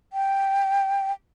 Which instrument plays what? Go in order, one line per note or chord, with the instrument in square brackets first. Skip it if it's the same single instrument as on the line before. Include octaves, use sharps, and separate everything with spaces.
[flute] G5